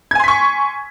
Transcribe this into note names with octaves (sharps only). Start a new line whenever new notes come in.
G#5 C6 C#6 G#6 B6